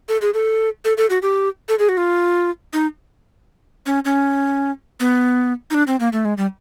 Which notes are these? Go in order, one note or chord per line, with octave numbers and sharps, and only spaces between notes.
A4
G#4
A4
A4
A4
F#4
G4
A4
G#4
F#4
F4
D#4
C#4
C#4
B3
D#4
D4
C4
A#3
A3
G#3
G3